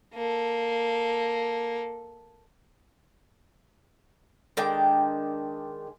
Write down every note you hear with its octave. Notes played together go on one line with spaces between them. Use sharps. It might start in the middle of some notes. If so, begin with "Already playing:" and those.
A#3 A4
D#3 G#3 D4 G5